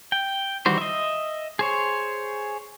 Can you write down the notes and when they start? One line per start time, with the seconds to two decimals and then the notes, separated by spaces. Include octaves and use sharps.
0.12 G5
0.66 D#3 E3 G3 F#4 C5
0.78 D#5 E5
1.59 G#4 C5 C#5